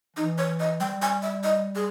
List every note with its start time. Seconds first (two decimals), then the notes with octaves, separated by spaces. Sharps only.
0.17 E3 D#4
0.38 C#5
0.60 D#5
0.81 G3 G5
1.02 G#5
1.23 E5
1.44 D#5
1.76 G#4